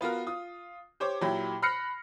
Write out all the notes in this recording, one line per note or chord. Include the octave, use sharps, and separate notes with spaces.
B3 F4 F#4 A#4
F4 D#6
G4 C5 C#5 D6
A#2 F#3 E4 G4 G5 B5
B5 F6 F#6 A#6 C7 C#7